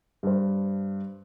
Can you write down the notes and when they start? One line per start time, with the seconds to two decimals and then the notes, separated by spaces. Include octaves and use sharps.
0.23 G2 C5